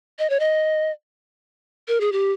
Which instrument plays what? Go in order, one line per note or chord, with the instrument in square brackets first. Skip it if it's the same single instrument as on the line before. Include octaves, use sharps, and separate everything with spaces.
[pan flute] D#5
C#5
D#5
A#4
G#4
G4